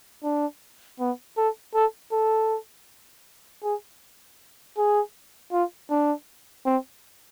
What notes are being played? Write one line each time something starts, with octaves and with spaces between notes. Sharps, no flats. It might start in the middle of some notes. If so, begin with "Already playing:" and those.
D4
B3
A4
A4
A4
G#4
G#4
F4
D4
C4